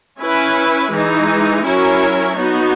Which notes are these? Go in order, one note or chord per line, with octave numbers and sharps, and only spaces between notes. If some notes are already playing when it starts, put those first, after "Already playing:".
C#4 E4 B4
E3 G#3 D#4
F#3 C#4 E4 A#4 C#5
B3 D#4 F#4